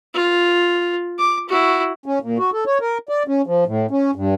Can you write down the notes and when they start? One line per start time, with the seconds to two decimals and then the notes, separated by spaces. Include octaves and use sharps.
0.14 F4
1.19 D6
1.49 E4 F#4
2.06 C#4
2.22 A#2
2.39 F#4
2.53 A4
2.66 C#5
2.81 A#4
3.09 D5
3.28 C#4
3.47 F3
3.67 A2
3.91 C#4
4.16 G2